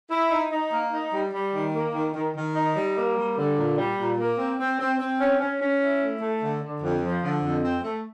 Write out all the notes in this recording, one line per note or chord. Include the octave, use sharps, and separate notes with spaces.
E4
D#4
D#4
A#3
D#4
G3
G3
D#3
A#3
D#3
D#3
D#3
D#4
G3
A#3
G3
D3
A#2
G3
A#2
A#3
C4
C4
C4
C4
C#4
C#4
C#4
E4
A3
A3
D3
D3
F2
F3
D3
F2
C4
A3